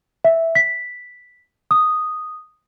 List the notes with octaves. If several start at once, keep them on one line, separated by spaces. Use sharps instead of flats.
E5
B6
D#6